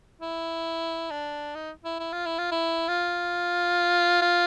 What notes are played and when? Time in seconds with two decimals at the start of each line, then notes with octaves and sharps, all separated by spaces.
0.21 E4
1.11 D4
1.55 D#4
1.85 E4
2.00 E4
2.13 F4
2.26 E4
2.38 F4
2.52 E4
2.88 F4
4.22 F4